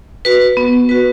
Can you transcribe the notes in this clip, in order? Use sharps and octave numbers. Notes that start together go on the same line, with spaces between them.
F#4 B4
B3
F#4 B4